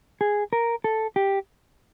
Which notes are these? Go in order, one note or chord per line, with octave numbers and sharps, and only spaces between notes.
G#4
A#4
A4
G4